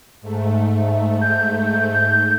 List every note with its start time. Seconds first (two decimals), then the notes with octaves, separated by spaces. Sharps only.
0.22 G#2 A3
1.21 G6